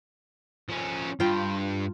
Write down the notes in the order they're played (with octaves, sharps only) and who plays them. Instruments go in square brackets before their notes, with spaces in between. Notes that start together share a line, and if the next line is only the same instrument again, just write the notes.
[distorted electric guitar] F3 C#4
[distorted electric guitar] G2 [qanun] F4 G5